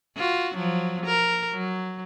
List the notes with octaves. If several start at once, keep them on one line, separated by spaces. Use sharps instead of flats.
F4 F#4
F3 F#3
A#4
F#3